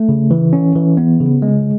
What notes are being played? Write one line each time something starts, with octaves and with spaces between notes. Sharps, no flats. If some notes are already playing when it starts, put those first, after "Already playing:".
Already playing: A3
C#3
E3
C#4
E3
B3
C#3
G#3